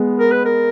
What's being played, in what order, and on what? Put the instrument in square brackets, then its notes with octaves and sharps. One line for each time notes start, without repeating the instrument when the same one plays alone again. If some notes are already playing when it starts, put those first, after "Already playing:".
Already playing: [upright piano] G#3 B3
[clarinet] A#4
B4
A#4